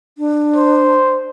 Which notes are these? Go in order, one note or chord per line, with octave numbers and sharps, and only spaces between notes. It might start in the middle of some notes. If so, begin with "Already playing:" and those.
D4
C5